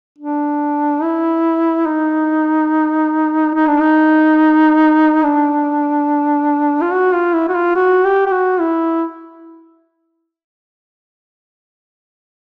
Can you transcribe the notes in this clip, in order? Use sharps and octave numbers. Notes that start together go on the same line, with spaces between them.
D4
E4
D#4
D#4
D4
D#4
D4
F4
F#4
F4
E4
F#4
F4
F#4
G4
G4
F#4
E4